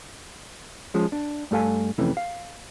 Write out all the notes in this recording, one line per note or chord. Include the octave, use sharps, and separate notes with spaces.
F3 G#3 C#4
D4
G2 A3 A4 F5 G#5
F2 C3 E3 A3 C#4
F5